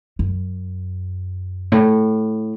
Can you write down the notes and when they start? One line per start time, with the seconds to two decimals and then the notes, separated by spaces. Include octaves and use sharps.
0.19 F#2
1.72 A2